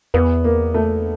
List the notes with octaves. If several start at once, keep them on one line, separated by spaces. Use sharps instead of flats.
E2 B3
A#3
A3